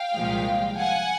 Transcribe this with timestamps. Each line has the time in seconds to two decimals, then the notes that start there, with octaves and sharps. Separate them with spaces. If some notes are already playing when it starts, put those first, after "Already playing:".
Already playing: F5 G5
0.16 C2 A#2 F3 G#3
0.79 F#5 G#5